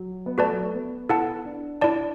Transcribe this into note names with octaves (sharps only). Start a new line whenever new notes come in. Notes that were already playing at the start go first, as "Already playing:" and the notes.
Already playing: F#3
B3
A3 F#4 B4 D5 A5
F#3
A3
B3
E4 A4 F#5 A5
D4
E4 D5 A5